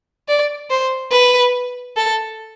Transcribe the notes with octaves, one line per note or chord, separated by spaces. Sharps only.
D5
C5
B4
A4